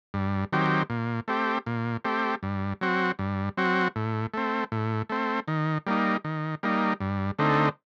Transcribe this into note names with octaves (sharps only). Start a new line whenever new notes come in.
G2
D#3 F#3 C4 G4
A#2
A3 C4 G4
A#2
A3 C4 G4
G2
F#3 C4 F#4
G2
F#3 C4 F#4
A2
A3 C4
A2
A3 C4
D#3
G3 A#3 D#4
D#3
G3 A#3 D#4
G2
D3 A3 C4 D#4